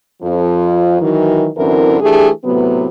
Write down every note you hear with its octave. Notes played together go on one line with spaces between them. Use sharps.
F2 F3
D#3 E3 F#3
F#2 D3 E3 C4 E4 A#4
E3 A3 D4 G4 G#4
A2 C3 F#3 B3